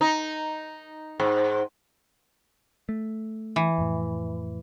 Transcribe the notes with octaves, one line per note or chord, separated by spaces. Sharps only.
D#4
G#2
A3
E3
F2 A2